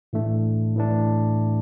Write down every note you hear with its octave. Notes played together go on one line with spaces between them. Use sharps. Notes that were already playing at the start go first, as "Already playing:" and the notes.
A2 E3 A3 D4
A2 E3 A3 D4